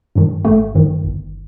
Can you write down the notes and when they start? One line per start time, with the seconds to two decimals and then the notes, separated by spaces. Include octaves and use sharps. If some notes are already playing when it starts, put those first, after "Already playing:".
0.15 G2 D#3
0.45 G#1 A3
0.75 G2 D#3
1.04 G1